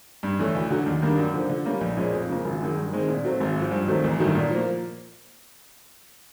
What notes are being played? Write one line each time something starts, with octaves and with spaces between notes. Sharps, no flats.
G2
E3 A3 C#4
D2
D3 F#3
D#2
D#3 G3 A#3 D4
F#2
D3 F3
D3
G3 A#3 C#4
A#1
A#2 F3 G#3 C#4
F2
C#3 F3 A#3
G#1
F#2 D#3 G#3
G2
D#3 G#3 C4
A#2
F#3 A3 C4
G#1
G#2 F3
G2
D#3 F#3 A3 C4
A1
G2 D#3 F#3 A3
A#2
F3 A#3